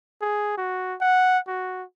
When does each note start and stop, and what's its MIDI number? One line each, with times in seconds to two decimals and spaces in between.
0.22 0.57 68
0.58 0.96 66
1.01 1.38 78
1.48 1.84 66